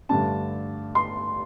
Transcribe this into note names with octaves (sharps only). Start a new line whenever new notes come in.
G2 D3 A3 D4 A5
C6